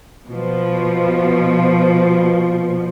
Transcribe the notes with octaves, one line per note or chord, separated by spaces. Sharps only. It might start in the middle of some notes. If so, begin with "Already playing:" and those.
B2 F3